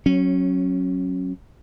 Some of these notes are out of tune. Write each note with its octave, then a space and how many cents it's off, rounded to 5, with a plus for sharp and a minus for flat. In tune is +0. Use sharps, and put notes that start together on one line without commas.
F#3 +0 C#4 -20